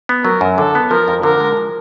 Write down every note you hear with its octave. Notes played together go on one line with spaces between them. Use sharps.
B3
F#3 A#4
F#2
D3 A4
B3
F3 A#4
F2
D3 A#4
G#3
F3